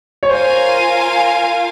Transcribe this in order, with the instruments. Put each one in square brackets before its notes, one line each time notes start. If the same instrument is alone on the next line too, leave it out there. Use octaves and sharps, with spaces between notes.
[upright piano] C#5
[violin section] F4 A#4 F5 G#5 [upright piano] C5